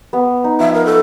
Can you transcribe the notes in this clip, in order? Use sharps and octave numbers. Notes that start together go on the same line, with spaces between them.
B3
D#4
F3 E5
A#4
A4